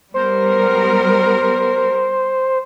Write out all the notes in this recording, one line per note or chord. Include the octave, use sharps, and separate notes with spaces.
G3 B3 A#4 C5